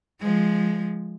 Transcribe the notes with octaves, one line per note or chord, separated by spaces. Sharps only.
F3 G#3